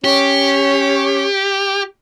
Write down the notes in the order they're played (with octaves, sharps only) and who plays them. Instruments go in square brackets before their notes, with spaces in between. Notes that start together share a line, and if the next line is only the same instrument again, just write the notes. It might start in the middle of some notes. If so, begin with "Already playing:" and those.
[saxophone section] C#4 C#5 [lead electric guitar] G4